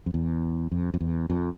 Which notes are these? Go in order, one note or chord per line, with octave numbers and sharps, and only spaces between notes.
F2
E2
F2
F2
E2
F2